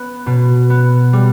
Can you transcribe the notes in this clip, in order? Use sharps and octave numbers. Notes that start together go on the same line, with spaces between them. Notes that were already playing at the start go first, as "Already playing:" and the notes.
Already playing: B3
B2
B3
G3